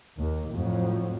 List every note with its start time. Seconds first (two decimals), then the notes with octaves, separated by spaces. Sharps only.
0.16 D#2
0.53 F2 A2 F3 F#3